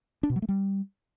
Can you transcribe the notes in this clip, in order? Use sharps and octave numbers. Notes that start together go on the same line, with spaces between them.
D4
B2
F#3
A3
G3